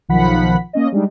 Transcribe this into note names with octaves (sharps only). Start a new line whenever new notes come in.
B1 D#3 F3 F#5 B5 B6
A#3 C#4 D#5
G3 G#3 D4 D#4